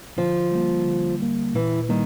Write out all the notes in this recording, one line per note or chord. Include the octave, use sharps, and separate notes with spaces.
D3 F3
G3 A#3
D3
G3 A#3
A#2 E3
D#3 G3 A#3